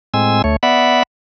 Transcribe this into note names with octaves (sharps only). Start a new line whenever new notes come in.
A2 G#3 C4 G#5 E6
D2 A3 C#5
B3 D5 E5 F#5 B5